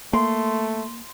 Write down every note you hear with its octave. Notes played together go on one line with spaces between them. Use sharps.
A3 A#3 C6